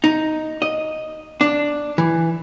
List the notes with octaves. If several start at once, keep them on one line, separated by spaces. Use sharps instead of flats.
D#4
D#5
D4
E3